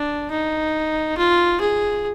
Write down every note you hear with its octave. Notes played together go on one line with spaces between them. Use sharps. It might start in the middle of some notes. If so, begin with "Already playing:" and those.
Already playing: D4
D#4
F4
G#4